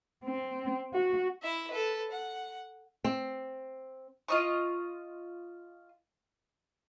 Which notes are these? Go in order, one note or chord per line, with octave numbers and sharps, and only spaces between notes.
C4
F#4
E4 E5
A4 B4
F#5
C4
F4 D#5 C#6